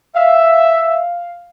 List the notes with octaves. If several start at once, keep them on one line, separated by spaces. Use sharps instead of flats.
E5 F5